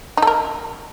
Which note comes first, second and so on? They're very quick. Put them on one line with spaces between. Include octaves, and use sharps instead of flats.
D#4 A4 A#4